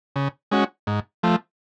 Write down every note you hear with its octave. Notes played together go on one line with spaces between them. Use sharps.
C#3
G#3 C#4 F#4
G#2
F3 A3